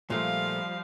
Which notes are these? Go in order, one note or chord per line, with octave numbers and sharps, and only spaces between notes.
A#2 F3 G3 A3 F5